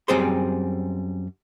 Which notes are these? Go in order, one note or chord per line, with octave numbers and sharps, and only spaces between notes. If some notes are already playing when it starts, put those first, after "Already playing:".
F#2 G3 C4 G#4 C5 C6